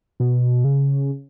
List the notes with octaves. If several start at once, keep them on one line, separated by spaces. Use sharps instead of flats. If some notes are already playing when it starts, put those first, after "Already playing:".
B2
C#3